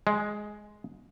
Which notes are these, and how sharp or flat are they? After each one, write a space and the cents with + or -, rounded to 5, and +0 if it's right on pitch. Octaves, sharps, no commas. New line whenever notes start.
G#3 +5